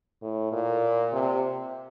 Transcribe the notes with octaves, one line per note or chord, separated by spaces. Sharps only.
A2
A#2
C3